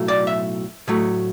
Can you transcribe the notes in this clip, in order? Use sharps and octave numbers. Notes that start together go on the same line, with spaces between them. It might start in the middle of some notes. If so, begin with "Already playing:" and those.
Already playing: B1 A2 F#3 A3
D5
E5
A2 F#3 A3